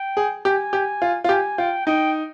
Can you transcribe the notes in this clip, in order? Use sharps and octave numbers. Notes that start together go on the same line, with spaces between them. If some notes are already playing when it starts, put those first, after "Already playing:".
Already playing: G5
G#4
G4 G#5
G4
F4
F4
G4 G#5
F4 G5
D#4 G5